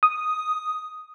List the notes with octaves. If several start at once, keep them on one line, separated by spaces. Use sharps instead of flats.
D#6